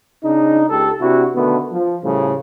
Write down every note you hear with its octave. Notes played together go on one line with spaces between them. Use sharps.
C#3 D4 D#4
C#2 G4 A4
C3 D4 E4 F#4
B2 D3 D#3 A3 B3
F3
A2 C#3 F3 G3